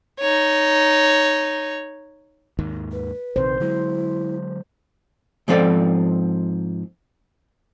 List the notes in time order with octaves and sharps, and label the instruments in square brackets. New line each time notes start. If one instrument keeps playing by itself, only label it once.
[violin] D#4 C#5
[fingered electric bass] D#2 G#2 D#3
[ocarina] B4
[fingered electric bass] A#1 C3 D#3 [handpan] C5
[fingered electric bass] D3 F#3 G#3 [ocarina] E4
[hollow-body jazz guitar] G#2 F3 C4 E4 A4 D5